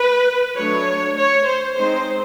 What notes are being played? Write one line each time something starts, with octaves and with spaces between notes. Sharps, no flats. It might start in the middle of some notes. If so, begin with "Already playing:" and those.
Already playing: B4
F#3 A3 D4 C#5
C#5
C5
G#3 C4 D#4 C5